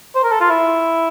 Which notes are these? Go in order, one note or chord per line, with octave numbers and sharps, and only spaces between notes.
C5
A#4
A4
F4
E4